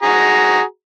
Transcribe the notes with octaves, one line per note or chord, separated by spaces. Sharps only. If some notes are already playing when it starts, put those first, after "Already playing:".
F#4 G#4 A#5